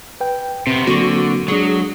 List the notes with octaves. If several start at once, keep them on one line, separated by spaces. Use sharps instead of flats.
B4 G5
C3 B3 C4
D3 F#3 A#3 C4 F#4
F#3 G#3 D4 G#4